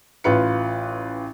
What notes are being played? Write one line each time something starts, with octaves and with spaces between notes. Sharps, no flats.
A1 F4 B4 C#7